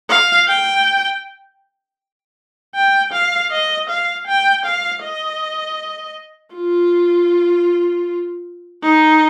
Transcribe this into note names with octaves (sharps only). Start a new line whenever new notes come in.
F5
G5
G5
F5
D#5
F5
G5
F5
D#5
F4
D#4